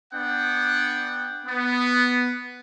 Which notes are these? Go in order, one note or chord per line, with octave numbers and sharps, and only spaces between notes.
B3 D4 F#5 G5
B3